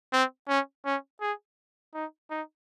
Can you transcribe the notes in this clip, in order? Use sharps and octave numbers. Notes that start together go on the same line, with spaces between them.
C4
C#4
C#4
G#4
D#4
D#4